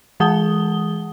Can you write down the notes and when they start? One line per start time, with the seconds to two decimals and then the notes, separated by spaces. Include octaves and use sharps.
0.20 E3 G#3 G#4 F#5 D#6 G7